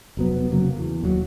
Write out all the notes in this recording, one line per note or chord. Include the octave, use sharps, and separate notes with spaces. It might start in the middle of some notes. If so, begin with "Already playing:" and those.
F1 F#3 B3
F1 C#3 F#3 A#3
E2
E1 D#2 C#3 F#3